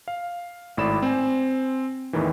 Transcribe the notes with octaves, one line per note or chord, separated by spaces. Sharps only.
F5
G#1 A2 D5 B5 E7
C4 C5 G#5
E2 A2 D#3 E3